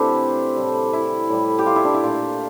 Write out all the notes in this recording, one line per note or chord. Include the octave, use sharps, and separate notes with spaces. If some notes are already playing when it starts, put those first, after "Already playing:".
Already playing: C3 E3 A3 D4 E4 G4 A4 C5
A2 G3
E4
A2 G3
G4
F4
E4
D4
E4
A#2 A3 F4